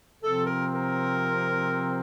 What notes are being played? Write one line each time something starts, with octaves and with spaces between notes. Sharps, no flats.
C3 F3 C4 A4
A#4
A#4